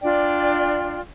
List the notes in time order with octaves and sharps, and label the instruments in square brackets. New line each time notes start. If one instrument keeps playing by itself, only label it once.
[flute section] D4 F4 D5 G5